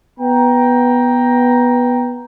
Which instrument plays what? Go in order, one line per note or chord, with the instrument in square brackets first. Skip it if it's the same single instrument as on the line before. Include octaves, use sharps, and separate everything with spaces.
[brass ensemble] B3 G5 A#5